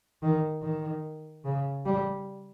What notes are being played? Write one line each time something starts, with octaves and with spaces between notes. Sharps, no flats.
D#3
D#3
C#3
G3